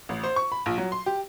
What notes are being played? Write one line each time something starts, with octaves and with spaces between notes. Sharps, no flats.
A1
C5
C#6
B5
A#1
F#3
C6
G4